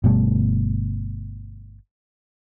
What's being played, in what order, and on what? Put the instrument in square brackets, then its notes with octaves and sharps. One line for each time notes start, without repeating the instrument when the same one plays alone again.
[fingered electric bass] G1 B2 G3 A3